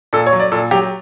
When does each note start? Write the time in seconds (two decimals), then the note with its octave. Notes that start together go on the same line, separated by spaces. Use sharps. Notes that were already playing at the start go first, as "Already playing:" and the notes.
0.13 A#2 A4
0.26 C#5
0.33 F#3
0.40 D5
0.52 A#2 A4
0.71 F#3 G4